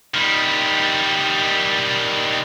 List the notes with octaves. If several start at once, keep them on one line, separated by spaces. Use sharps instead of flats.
D#3 G3